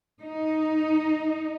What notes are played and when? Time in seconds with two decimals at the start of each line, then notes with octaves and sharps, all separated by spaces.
0.21 D#4